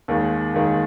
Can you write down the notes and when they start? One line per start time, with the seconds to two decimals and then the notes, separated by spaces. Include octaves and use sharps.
0.08 D#2 D#3 G#3
0.54 D#2 D#3 G#3